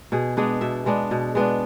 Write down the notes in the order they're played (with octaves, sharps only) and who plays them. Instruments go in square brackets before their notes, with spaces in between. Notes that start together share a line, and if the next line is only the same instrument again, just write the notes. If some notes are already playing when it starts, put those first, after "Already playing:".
[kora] B2 G#4
G#3 B3 D4 G#4
B2 E5
G#3 B3 D4
B2
G#3 B3 D4